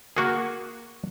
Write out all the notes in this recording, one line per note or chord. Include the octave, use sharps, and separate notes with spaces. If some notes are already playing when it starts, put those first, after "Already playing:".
A#3 F#4 G#4 A#4 F#5 C#6